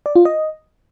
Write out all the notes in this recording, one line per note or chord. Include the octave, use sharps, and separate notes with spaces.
D5
F4
D#5